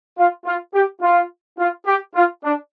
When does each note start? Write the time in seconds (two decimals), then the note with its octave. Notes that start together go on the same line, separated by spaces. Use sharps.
0.18 F4
0.45 F4
0.74 G4
1.02 F4
1.59 F4
1.86 G4
2.15 F4
2.43 D4